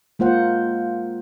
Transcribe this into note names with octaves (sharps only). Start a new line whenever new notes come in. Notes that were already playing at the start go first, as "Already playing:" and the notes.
G#3 A#3 F4 C5 F#5